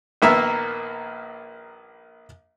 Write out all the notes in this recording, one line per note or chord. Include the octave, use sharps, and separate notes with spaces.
A#1 D#3 A#3 B3 E5 F6